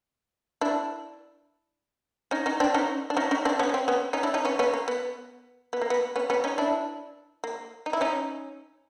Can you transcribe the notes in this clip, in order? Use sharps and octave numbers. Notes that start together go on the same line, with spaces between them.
D4 E4
C#4 D#4
C#4 D#4
C4 D4
C#4 D#4
D4
C#4 D#4
C#4 D#4
C4 D4
B3 C#4
C#4
C4
B3 C#4
C#4 D#4
D4 E4
C#4 D#4
B3 C#4
B3 C#4
A#3
B3
B3
A#3
B3
B3 C#4
B3 C#4
C#4 D#4
D4 E4
A#3
D#4
E4
C#4 D#4